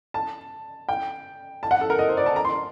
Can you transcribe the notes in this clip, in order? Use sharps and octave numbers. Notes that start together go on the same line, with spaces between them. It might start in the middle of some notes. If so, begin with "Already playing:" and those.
A5
G5
A5
F#5
A4
A#4
D#5
C5
D5
A5
A#5
C6